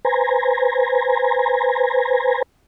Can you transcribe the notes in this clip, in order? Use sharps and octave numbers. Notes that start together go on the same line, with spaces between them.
B4 C5 G#5 A#5